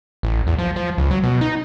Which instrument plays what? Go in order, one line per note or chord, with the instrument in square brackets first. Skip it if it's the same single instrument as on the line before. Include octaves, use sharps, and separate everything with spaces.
[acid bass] A1
E2
F3
F3
C#2
F#3
B2
D#4